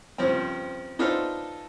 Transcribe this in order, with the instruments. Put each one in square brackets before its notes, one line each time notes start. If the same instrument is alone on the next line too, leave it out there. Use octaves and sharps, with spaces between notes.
[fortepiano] G2 C#3 F3 C4
B3 D4 D#4 F4 A4 C5